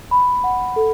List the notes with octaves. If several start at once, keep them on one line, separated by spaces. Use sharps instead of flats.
B5
F#5
A4